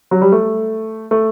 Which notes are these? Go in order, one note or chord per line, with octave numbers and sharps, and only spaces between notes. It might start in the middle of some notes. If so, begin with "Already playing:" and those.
F#3
G3
A3
A3